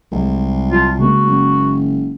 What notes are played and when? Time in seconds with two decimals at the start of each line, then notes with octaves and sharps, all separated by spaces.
0.12 C2 F#3 G#3
0.71 F#3 F4 A5
0.99 C#3 G#3 A#3 F#4
1.26 F#1